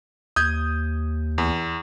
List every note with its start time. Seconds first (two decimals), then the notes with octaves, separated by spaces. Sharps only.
0.36 D#2 D#6 G6 G#6
1.38 E2